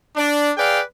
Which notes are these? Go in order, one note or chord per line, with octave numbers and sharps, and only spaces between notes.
D4
G#4 B4 D5 F5 G5